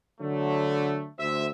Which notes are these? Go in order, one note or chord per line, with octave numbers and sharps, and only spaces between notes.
D3 F#3 A3
D2 C5 E5